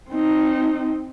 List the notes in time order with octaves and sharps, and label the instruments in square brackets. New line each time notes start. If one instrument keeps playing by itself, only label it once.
[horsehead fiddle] C4 D#4